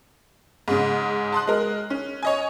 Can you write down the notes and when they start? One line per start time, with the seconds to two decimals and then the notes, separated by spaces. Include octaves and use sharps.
0.68 G#2 C#3
1.32 A5 C6 D#6 F#6
1.47 G#3 A#4
1.90 C#4
2.23 C#5 D#5 G#5